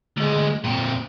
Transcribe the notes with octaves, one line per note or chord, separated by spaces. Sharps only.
D2 G#3
A#2 C4